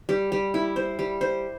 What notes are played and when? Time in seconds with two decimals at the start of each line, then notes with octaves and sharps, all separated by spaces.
0.09 G3
0.32 G3
0.54 E4
0.76 C5
0.99 G3
1.21 C5